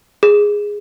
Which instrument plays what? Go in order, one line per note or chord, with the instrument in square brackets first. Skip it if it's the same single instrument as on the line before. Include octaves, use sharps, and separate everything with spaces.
[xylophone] G#4